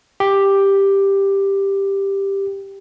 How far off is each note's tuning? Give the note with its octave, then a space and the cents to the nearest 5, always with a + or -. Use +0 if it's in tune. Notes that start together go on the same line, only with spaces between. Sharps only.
G4 +5